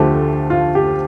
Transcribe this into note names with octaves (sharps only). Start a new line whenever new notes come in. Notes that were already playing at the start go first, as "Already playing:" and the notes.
Already playing: D2 D3 F3 A3 G4
F4
G4